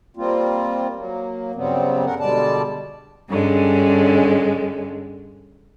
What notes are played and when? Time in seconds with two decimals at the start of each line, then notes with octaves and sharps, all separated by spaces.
0.17 G3 A#3 C4 F4
0.96 F#3 A#3
1.55 G2 C#3 F#3 G3 B3 C4
2.05 D3 C#4 A#4 F#5
2.20 B2 D3 G3 G#3 D5 A5
3.29 G2 D3 G#3 C#4